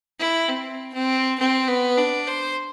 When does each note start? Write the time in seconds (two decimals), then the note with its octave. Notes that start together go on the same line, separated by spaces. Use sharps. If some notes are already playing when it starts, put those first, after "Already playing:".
0.19 E4
0.48 C4
0.93 C4
1.39 C4
1.68 B3
1.97 D4
2.27 C5